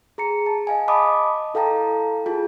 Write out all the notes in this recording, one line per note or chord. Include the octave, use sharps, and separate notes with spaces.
G#4 A#5 C#7
A5
D#5 F5 G#5
D#5 A5 B5 D6 D#6
E4 A4 F5 G5 A5 A#5
F4 G#4 A5